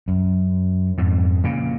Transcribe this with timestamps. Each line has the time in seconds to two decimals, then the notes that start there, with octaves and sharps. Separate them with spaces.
0.08 F#2
0.98 F2 G#2
1.44 A#2 C#3